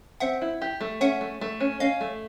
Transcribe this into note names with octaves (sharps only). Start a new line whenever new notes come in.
C4 E5 F#5
E4
G4
A3
C#4 E5 F#5
A3
A3
C#4
C#4 D#5 F5
A3